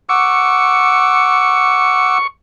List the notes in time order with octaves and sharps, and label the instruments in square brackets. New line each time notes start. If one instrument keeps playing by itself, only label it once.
[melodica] F#5 D6 E6 [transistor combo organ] C#6